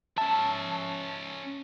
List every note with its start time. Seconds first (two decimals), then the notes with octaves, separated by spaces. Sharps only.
0.18 C#4 E5 A5